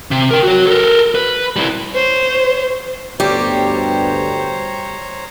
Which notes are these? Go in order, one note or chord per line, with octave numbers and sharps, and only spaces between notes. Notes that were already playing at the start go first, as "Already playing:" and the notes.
C3
A#4 G5
F#4 C#5
A4 A#4
B4
G3 E4
C5 C#5
D2 G2 G3 B3 G4 C5 C#5 A#5